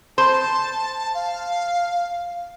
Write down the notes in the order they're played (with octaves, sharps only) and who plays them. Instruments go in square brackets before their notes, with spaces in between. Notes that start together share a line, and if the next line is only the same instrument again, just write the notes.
[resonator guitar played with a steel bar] C5 [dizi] A5
[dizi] F5